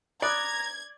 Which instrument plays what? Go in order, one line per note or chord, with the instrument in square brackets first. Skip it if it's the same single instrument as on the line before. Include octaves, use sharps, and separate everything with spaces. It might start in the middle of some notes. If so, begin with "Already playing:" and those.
[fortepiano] D5 [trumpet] A#5 [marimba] B5 D#6 F#6 [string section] G#6